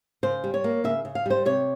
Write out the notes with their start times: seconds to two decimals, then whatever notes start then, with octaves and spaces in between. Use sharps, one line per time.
0.23 C#3 C5
0.44 G3
0.54 C#5
0.64 A#3
0.84 C#3 E5
1.05 C#3
1.15 F5
1.26 G3 C5
1.46 C3 C#5